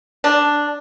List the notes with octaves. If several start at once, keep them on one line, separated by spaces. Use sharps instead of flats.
D4